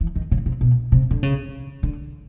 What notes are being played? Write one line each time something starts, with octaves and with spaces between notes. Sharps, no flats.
E3
D#3
C#3
C3
B2
C3
D3
C#3
D3